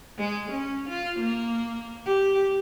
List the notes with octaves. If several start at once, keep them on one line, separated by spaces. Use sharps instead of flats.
G#3
C#4
F4
A#3
G4